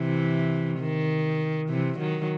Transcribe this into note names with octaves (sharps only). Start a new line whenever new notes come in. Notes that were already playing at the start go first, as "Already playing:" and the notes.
Already playing: C3 E3
D#3
C3 E3
D#3 F#3